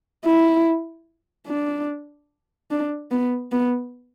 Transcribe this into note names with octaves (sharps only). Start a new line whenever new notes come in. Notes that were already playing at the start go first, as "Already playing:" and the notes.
E4
D4
D4
B3
B3